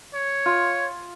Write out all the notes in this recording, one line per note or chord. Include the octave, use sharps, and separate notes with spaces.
C#5
F4